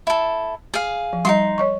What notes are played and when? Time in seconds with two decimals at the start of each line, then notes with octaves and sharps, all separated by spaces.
0.07 E4 A4
0.74 G#4 F5
1.13 F3
1.25 G3 D#4 F#4 C6
1.58 C#5 D#5 C#6